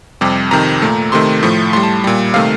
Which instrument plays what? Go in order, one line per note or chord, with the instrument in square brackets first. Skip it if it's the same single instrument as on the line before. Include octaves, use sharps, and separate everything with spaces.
[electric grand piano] F2 C3 G3 D6
F2 C3 D#3 A#5
A#2 A3
C3 D#3 A3 C6
A2 F3 A3
A2 G3 C6
A5
A#2 G3
C3 D#3 A3 F5